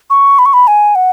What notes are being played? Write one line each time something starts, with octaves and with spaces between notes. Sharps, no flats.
C#6
B5
C#6
B5
G#5
F#5